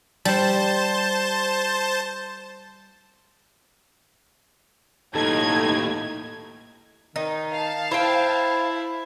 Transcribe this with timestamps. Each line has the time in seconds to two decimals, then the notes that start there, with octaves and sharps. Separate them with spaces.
0.25 G3 C5 A5
5.15 D#2 A2 D#4 A4 G#6
7.16 D#3 D#4
7.53 F5 A5
7.91 E4 C5 G5